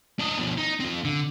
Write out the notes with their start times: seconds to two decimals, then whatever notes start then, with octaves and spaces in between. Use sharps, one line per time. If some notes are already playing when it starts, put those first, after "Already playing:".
0.19 D4 D#5
0.38 B2 F3
0.57 D#4
0.80 F3 C4
1.05 D3